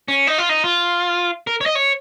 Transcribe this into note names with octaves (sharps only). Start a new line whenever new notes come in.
C#4
D#4
F4
D#4
F4
A#4
C#5
D#5
C#5